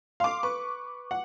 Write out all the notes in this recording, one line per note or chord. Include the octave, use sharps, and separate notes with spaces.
F5 C6 D6
B4 C#6
F#5